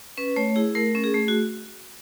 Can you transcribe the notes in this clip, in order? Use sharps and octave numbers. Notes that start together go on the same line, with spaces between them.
C#4 B4
A3 C#5
E4 G#4
A3 A#4
C#4
G#4
A3
F#4